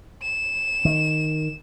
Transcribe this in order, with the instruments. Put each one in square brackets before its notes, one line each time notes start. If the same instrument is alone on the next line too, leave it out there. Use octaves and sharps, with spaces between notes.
[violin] E7
[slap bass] D#3